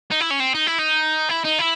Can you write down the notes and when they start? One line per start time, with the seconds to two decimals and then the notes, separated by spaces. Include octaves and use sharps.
0.11 D#4
0.20 E4
0.30 C#4
0.40 C4
0.55 D#4
0.67 E4
0.79 D#4
1.29 E4
1.44 D#4
1.59 E4